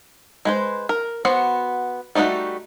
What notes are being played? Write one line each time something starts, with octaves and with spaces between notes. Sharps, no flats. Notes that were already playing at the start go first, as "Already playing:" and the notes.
G#3 B4 C5
A#4
B3 F#4 C5 F#5
G3 A3 D#4 E4 F#4